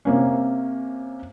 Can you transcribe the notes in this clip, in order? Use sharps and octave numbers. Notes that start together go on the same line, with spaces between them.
C3 A#3 C#4